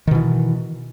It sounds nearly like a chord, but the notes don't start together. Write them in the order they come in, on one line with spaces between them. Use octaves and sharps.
D#3 B2 E3